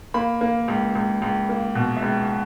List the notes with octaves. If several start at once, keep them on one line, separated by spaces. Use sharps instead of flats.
A#3 B5
A#3
C#2
C#2
C#2
A#3
B2
E5
C#2